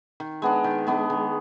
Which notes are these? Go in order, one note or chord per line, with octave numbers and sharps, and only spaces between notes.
D#3
G#3 B3 D4
D#3
G#3 B3 D4
D#3